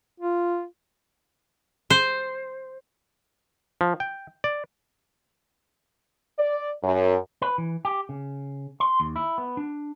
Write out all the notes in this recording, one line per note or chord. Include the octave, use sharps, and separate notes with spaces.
F4
C5
F3
G5
D5
D5
F#2
B4
E3
G4
C#3
C6
D#2
E4
B3
D4